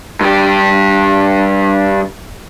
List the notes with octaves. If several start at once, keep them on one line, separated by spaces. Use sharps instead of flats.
G2 G4